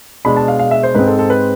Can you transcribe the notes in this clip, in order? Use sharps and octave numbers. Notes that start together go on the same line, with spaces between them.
B2 G#3 D4 B5
A5
F5
F5
E5
C5
G#2 G#3 C4 B4
A4
A4
B4